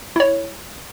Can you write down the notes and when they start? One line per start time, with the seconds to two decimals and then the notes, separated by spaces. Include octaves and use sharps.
0.16 E4 C#5